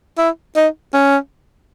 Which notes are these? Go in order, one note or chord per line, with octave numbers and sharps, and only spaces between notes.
E4
D#4
C#4